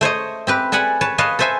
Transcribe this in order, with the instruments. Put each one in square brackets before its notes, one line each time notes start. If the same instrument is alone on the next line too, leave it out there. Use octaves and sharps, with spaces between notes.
[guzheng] A3 C5 C#5 D#5
C4 G4 B4
A4 D5 F#5 G#5 B5
B4 C#5 A5
B4 C#5 D#5 F5 A5
A4 B4 C5 E5 G#5